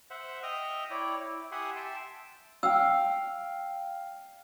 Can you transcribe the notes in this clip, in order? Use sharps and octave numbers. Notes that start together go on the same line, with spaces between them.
C5 E5 F#5
D#5 E5 G5 D#6 F6
E4 C#5 D5 G5
E4
G4 E5 F#5 G#5 C6 D#6
E5 G5 A5 C6
F5 G5 E6